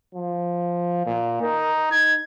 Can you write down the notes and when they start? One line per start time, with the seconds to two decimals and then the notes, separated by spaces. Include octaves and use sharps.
0.15 F3
1.06 A#2
1.42 D#4 A#4
1.91 D#4 G#6